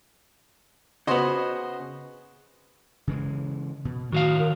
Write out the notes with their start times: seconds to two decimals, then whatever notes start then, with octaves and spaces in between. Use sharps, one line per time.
1.07 C#3 B3 F#4 C5 D#5
3.07 C#3 E3 G#3
3.85 B2
4.12 A2 D#3 F#3 F#4 F5
4.39 A#4